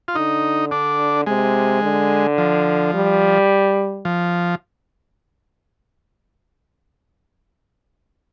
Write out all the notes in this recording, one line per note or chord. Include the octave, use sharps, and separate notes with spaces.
F4
D3 D#4
D4
C3 G#3
D3
F3
G3
F3